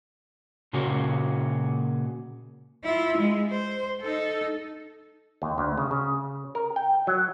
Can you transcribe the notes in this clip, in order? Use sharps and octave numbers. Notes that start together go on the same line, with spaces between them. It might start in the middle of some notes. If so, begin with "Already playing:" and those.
A#2 C#3 A#3 C#4 F#4
E4 F4
G#3
C5
D#4 A4
D#2
D2
C#3
C#3
A#4
G5
F#3